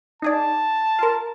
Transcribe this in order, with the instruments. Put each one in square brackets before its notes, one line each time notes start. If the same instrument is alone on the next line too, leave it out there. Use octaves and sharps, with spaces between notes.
[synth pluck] D#4 G#4 D5 [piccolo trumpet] A5
[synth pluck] F4 A#4